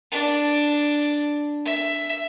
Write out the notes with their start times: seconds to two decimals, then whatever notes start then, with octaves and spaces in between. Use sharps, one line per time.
0.11 D4
1.65 E5